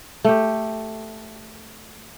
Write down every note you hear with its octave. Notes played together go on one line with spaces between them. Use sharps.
A3 G4